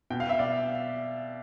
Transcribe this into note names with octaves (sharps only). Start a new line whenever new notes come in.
B2 G5
F5
E5
D5 F5